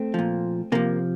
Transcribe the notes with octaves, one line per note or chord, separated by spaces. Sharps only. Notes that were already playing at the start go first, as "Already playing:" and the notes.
Already playing: A3 C4
A#2 F3
C3 F3 A#3